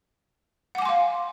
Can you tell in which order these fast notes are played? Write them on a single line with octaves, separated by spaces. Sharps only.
F#5 D6 G#5 C6 F5